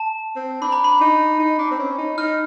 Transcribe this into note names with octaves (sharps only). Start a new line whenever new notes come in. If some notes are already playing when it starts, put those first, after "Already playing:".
Already playing: A5
C4
D4 B5
A#5
B5
D#4
D#4
D4
C4
C#4
D#4
D#4 F6